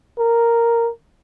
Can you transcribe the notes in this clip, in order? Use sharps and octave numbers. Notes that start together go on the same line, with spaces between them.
A#4